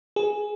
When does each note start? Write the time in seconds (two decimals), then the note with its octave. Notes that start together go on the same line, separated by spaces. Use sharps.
0.16 G#4